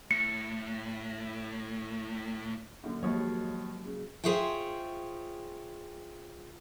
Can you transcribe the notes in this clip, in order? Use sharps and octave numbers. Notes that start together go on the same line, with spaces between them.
A2 C#7
F#2 A#2 D3
D#2 F3 F#3 G#3 A#3 C#5
C#3
F4 G#4 C5 C#5 E5 G5